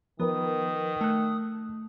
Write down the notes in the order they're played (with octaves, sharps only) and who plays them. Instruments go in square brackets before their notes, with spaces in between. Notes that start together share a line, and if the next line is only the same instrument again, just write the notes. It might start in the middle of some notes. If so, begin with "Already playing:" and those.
[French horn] D#3 [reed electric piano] F3 A#4 B4 [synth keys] B3 [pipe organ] D#6
[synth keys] A3 [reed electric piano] E6 F#6